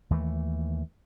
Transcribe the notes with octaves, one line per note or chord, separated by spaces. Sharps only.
D#2 E3 F#3 A3